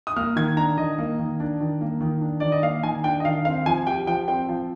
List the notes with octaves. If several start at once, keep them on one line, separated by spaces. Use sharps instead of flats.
D#6
A#3 F6
D#3 G#6
D4 A#5
D#3 D#5
A#3
D#3
D4
D#3
A#3
D#3
D4
D#3 D5
D#5
A#3 F5
D#3 G#5
D4 G5
D#5
D#3 F5
C4 F5
F3 G#5
G4 G5
F3 G5
C4 G5
F3